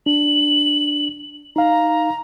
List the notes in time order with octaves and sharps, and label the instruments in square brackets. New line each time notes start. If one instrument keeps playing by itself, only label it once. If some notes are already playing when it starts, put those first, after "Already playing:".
[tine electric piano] D4 [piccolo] F#7
[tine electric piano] D#4 F5 [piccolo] A#5